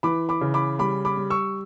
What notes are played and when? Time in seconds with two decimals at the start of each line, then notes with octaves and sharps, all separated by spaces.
0.03 E3 B5 D6
0.29 B5 D6
0.41 C#3
0.54 B5 D6
0.79 G3 B5 D6
1.05 B5 D6
1.17 G3
1.30 C#6 E6